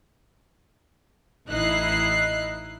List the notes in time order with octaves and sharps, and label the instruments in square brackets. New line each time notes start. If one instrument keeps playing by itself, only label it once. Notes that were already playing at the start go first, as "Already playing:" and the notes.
[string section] A1 D#4 E4 F#6 C7